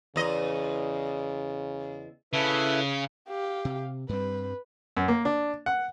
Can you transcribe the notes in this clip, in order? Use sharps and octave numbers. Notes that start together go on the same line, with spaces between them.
E2 C#3 D#5
C#3 E4 A4 B4
G4 F5
C3
G2 G3 C4 B4
F#2
A#3
D4
F#5